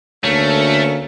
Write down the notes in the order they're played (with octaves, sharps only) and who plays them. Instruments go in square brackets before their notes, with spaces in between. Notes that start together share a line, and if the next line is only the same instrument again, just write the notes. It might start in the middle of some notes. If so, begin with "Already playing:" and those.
[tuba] D2 [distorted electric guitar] A3 [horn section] A#3 C#4 A4